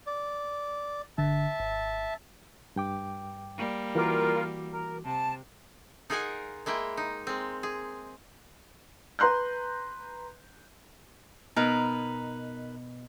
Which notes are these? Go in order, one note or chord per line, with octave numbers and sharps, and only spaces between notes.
D5
G1 D3 E5 A5
G#1
G2 G5 D6
G3 A#3
E3 F4 F#4 A#4 D6
A#4
C3 A5
D#4 F4 G#4 A#4 F#5 G#5
G#3 A#3 E4 G5
D#4
G#3 C4
G#4
B4 A#5 C6 F#6 G6
B2 D#4 A#4 B4